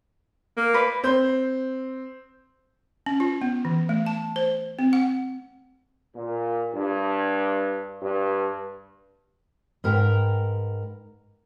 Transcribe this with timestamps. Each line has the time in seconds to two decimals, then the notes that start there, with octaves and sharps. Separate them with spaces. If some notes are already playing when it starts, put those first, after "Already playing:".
0.58 A#3
0.74 A#4 B4 D5
1.03 C4 C6 G6
3.06 C#4
3.20 F4
3.42 B3
3.65 E3
3.89 A3
4.06 A5
4.36 C5
4.79 C4
4.93 F#5
6.14 A#2
6.73 G2
8.01 G2
9.84 G#2 A#4 B4 G5 A#5